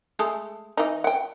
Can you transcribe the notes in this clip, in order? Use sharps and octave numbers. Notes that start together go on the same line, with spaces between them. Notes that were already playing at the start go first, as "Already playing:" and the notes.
G#3 A3 A4
E3 D#4
F#5 G5